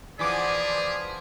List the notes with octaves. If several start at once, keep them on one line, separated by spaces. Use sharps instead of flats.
E3 F3 B3 G#4 D5 D6 B6